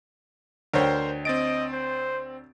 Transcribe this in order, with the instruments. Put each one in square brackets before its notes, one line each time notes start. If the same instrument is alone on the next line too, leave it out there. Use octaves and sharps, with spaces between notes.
[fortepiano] D2 C#5 G5 [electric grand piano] A#4 C5
[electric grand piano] C4 A6 D7 [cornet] D#5
[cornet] C5